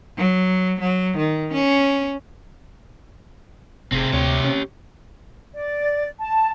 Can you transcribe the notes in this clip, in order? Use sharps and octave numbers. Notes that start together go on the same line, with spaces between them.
F#3
F#3
D#3
C#4
F1 C3 C4 G#4
D2 G4 C#5
C#4
D5
A5